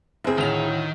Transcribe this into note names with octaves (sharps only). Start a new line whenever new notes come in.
F#1 C4 E4 G#4
D2 A2 D#3 F7